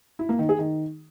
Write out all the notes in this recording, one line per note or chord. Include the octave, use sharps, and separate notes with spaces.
E4
A#3
D#3
G#4
D#3